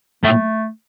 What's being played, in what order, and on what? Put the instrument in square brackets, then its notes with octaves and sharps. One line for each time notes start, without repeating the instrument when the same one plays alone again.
[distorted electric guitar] A2 [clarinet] A3